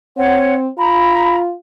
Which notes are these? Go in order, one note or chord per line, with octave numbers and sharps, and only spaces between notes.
C4 C#5 F#5
F4 A#5 B5